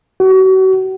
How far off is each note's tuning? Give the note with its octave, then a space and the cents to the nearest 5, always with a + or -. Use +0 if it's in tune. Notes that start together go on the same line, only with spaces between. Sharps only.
F#4 +35